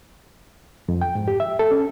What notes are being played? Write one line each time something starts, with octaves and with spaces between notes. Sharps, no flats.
F2
G5
G#2
G4
E5
A4
C#4